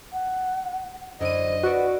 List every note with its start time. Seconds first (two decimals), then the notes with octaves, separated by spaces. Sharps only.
0.13 F#5
1.21 F#2 D3 E3 C5 D#5 D#7
1.63 E4 F#4 B4 D5